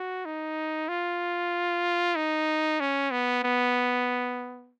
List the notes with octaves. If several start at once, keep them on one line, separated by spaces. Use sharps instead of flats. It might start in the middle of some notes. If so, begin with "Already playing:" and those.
Already playing: F#4
D#4
F4
D#4
C#4
B3
B3